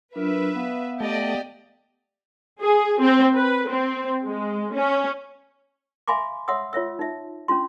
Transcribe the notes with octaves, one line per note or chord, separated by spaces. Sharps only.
F#3 D4 F4 A#4 B4 E5
B3 F5
A3 G4 D5 D#5
G#4
C4
B4
C4
G#3
C#4
E5 F5 G#5 B5 C6 D6
C#5 E5 F#5 C6 D#6 E6
F4 C#5 E5 E6
D#4 E5
C#4 D4 F4 C6